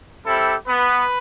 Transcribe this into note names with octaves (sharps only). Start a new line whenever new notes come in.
G3 C4 E4 G4 A4
B3 B4